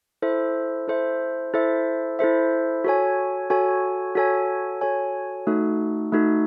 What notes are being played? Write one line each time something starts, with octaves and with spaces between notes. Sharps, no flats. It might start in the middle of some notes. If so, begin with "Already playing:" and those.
E4 A4 C5 E5
E4 A4 C5 E5
E4 A4 C5 E5
E4 A4 C5 E5
F#4 A4 C#5 G#5
F#4 A4 C#5 G#5
F#4 A4 C#5 G#5
F#4 A4 C#5 G#5
A3 D#4 F#4 A4
A3 D#4 F#4 A4